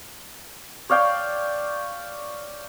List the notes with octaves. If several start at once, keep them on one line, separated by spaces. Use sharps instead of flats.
C#5 D5 F5 G5